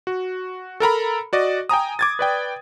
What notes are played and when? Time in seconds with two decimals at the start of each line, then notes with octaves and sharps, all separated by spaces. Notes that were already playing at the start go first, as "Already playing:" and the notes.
0.07 F#4
0.80 A4 A#4 A#5 B5
1.33 F#4 D5 D#5
1.69 G5 G#5 A#5 D#6
1.99 D6 G#6 A6
2.19 B4 D5 G5